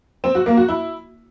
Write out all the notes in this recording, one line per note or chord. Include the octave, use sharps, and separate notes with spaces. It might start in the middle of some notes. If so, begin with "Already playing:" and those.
C4
F#4
A#3
F#4
E4